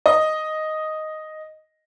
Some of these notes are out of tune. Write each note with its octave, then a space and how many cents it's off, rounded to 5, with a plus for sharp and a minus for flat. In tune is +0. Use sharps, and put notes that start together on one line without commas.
D#5 +0